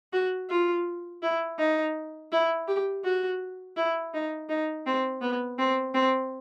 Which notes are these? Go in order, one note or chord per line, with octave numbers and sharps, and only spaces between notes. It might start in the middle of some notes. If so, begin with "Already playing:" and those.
F#4
F4
E4
D#4
E4
G4
F#4
E4
D#4
D#4
C4
B3
C4
C4